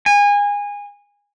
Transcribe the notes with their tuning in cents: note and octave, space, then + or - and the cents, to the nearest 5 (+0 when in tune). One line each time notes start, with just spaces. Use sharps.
G#5 -25